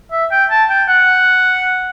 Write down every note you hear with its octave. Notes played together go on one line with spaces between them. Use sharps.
E5
G5
A5
G5
F#5